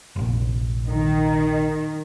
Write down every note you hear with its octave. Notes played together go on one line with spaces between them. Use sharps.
F1 A#1
D#3